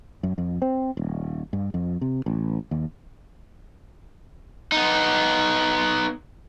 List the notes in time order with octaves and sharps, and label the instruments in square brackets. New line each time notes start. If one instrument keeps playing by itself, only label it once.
[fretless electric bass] F#2
F2
C4
D#1
G2
F2
C3
A1
D#2
[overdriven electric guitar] B3 D#4